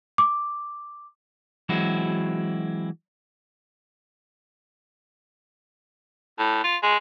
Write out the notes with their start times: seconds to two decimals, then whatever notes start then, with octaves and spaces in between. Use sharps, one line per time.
0.18 D6
1.69 E3 F#3 G#3 C4 E4 F#4
6.39 A2
6.64 F4
6.83 G#3